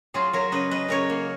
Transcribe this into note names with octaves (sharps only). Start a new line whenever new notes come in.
F#3 F4 G#4
F#3 A#4 C#5
C#3 B4 D#5
F#3 B4 D#5
C#3 A#4 C#5
A#3